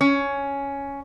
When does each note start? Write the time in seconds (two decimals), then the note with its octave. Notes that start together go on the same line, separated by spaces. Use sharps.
0.01 C#4